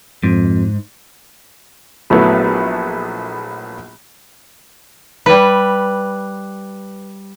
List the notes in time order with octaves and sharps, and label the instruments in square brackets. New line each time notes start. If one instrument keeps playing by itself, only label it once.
[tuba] F2 [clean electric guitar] G#2
[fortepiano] A#1 F#3 A3 B3 E4
[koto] G3 B4